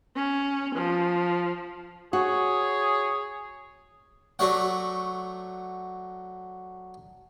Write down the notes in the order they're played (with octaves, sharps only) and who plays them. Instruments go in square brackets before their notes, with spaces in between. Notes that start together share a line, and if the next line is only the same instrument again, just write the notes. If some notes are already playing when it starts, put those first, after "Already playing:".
[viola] C#4
F3
[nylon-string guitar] F#4 [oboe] G#4 [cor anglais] C#5
[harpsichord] F#3 A3 D4 C#5 F#5